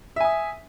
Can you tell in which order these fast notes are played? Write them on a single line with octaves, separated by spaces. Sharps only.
E5 G#5 D#6